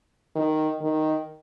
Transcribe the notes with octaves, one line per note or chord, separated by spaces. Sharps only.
D#3
D#3